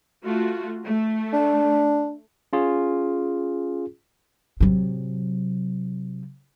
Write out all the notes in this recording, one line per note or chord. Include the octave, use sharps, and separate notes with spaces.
A3 F4 F#4
A3
D4
C#4 F4 G#4
C3 F#3